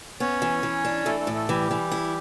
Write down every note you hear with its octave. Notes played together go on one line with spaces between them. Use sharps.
B3 C#4 C#5
E3
E3
D4
E3 A3 A4
A3 A4
A2
A3 A4
E3 G3 G4
E3
E4